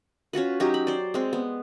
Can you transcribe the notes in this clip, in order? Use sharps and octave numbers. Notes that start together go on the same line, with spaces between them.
C#4 F4 F#4 B4
F#3 C#4 D#4 G4
B5
C5 D5
G#3 C4
B3